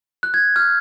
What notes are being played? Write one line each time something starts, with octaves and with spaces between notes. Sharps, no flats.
F#6
G#6
F6